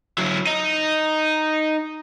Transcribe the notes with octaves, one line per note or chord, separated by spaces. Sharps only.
F#3 E4
D#4